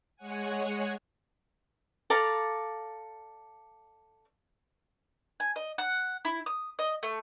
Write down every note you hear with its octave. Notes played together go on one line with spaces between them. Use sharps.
G#3 C#5 F#5 G#5
A4 D5 F5 A#5
G#5
D#5
F#5
E4
D#6
D#5
A3